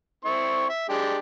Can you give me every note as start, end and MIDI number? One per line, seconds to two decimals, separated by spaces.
0.25 0.66 60
0.25 0.66 64
0.25 0.66 85
0.69 0.86 76
0.89 1.18 56
0.89 1.18 62
0.89 1.18 67